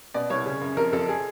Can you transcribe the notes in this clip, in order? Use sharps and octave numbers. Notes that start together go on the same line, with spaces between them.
B2 D5
C2 C#5
C#3
F#2
F2 A#4
F2 A4
G#4